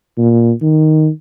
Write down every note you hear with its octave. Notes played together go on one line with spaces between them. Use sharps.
A#2
D#3